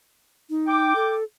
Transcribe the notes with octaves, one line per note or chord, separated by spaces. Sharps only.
D#4
G5 D6
A4